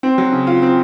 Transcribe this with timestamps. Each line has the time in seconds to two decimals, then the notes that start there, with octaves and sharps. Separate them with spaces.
0.03 C4
0.18 F#3
0.32 C#3
0.47 F4
0.62 C4